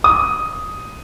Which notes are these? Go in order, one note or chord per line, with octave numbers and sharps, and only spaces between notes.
D#6